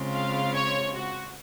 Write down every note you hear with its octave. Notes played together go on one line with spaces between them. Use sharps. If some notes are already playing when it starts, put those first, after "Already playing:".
Already playing: C#3 G#3 C4 F4
F5
C#5
F#4